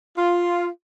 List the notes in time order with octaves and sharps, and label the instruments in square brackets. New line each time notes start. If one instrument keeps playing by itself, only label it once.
[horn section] F4